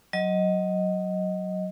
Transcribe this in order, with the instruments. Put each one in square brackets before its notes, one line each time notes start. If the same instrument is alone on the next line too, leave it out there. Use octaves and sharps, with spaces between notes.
[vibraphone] F#3 D#5